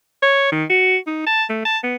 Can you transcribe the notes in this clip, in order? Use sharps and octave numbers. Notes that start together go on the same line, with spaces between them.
C#5
D#3
F#4
D#4
A5
A3
A5
B3